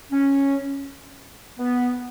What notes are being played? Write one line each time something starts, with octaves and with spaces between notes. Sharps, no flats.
C#4
B3